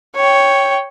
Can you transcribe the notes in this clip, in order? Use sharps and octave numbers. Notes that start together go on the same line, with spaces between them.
C#5 G5